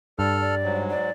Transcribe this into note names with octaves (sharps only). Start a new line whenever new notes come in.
G2 A4 D5 F6
D5
G#2 F#3
D5